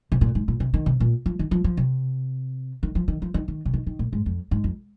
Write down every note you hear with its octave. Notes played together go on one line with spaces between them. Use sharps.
C3
A#2
G#2
A#2
C3
D#3
C3
A#2
F3
D#3
F3
F3
C3
D#3
F3
D#3
F3
D#3
D#3
C3
D#3
D#3
A#2
G#2
F2
G#2
F2